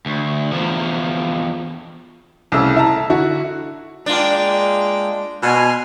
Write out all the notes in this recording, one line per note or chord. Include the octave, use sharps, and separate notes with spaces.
D2
E2 F3
C2 C#3 A3 E6
E4 A5 A#5
D3 E4 F#4
G#3 A#3 D4 F4 G5
B2 G#5 C6 F6